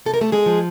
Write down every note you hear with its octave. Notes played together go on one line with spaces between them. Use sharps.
C3 A4
A#4
A3 A4
G#3 G#4
F3